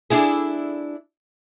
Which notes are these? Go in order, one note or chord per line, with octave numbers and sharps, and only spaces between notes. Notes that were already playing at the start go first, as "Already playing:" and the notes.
D4 E4 G#4